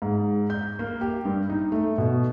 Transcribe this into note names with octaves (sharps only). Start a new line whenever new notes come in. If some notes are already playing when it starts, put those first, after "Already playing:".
G#2
G6
A#3
G4
G2
D#4
A3
B2